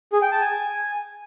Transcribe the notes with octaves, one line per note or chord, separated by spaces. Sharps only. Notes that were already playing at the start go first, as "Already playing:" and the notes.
G#4
G5
A5
G#5